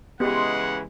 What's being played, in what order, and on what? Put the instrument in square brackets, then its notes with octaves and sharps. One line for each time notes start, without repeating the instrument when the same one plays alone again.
[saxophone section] C#3 E3 G#3 [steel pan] B3 G4 [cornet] F#5 [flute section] C6